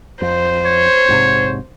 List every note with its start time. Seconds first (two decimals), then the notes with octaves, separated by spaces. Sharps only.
0.22 F2 C5
0.65 C#5
1.08 A#1 G#2 C3